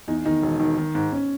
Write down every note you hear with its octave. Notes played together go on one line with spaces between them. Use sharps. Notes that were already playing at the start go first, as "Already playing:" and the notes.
E2 D#4
D#3 D#4
E1
D#3
D#3
G#2
C#4